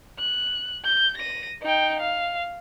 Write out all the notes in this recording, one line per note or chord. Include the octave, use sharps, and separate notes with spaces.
F#6
G6
A#6 D#7
D#4 G5
F5